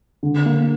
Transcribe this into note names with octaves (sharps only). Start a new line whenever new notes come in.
D3
A#3